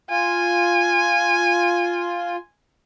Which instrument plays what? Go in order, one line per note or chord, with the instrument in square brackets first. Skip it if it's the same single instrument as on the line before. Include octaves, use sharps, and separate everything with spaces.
[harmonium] F4 [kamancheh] G#5